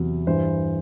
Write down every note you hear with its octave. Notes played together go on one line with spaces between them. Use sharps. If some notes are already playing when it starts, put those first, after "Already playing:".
Already playing: E2 C3 F#3
G2 E3 C5